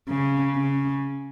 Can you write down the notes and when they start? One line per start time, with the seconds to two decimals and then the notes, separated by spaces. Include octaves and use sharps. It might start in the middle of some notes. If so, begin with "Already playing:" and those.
0.09 C#3
0.56 C#3